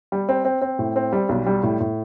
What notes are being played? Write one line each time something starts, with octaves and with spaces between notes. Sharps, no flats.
G3
C4
C4
C4
A2
C4
G3
B1
G3
A2
A2